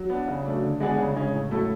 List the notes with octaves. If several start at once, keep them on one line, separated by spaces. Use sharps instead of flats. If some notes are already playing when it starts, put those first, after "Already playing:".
Already playing: F#3
B3 D4
C#3
F#3 A3 D4
D3
G#3 B3 D4 G#4
C#3
G#3 C#4
A2
F#3 A3 E4 A4